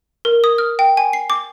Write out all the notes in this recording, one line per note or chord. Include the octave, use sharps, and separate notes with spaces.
A#4
D#6
F6
G5
G#5
C7
D6